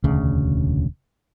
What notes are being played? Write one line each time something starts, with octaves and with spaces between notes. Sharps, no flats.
E1 D2 C#3